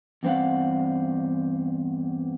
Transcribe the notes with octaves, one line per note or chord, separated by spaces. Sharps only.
E2 G2 C4 D4 F5 F#5